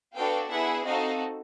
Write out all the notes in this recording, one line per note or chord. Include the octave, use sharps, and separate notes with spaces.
B3 D4 F#4 A4 F5 G5
B3 E4 G#4 E5 F#5
C4 D#4 F#4 A4 D#5 F5